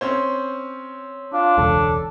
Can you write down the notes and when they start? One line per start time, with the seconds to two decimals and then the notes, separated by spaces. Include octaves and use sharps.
0.01 C4 C#4 C5
1.33 D4 F4
1.58 E1 C#2 A4